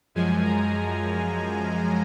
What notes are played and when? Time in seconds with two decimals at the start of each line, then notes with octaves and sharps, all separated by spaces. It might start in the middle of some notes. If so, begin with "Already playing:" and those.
0.15 F#2 F3 G#3 G#5
0.44 A#5